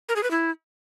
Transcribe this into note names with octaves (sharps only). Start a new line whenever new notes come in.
A#4
G#4
B4
E4